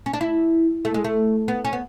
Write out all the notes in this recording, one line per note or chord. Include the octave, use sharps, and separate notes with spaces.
C#4
D4
E4
A3
G#3
A3
B3
C#4
B3